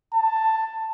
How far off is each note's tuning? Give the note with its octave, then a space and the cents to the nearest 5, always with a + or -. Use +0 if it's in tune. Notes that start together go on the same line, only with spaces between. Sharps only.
A5 +10